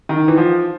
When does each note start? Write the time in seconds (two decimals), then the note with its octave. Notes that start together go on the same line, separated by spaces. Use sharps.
0.09 D#3
0.28 E3
0.37 F3